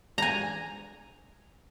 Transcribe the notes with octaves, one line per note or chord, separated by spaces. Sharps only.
G#5 A#5